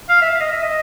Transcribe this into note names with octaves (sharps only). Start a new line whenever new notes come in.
F5
E5
F5
D#5
E5
D#5